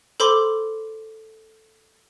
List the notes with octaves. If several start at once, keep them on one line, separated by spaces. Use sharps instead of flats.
A4 C5 B5 C6 D6